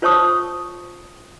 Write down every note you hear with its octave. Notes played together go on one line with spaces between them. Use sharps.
F4 C5 C#5 A5 C#6 D#6